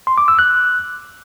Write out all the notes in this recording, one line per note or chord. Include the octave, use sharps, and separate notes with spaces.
C6
D6
E6
F#6